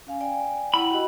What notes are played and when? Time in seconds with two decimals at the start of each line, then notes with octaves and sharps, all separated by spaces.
0.07 C#4 F5 G#5
0.21 D5 G5 G#5
0.74 E4 F#5 G5 B5
0.91 F#4 G4 D#5